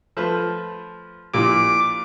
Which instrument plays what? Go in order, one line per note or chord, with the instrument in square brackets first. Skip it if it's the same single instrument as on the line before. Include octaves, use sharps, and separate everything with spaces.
[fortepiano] F3 A3 B4
[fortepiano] A#1 A#2 [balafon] E4 G4 [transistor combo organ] D6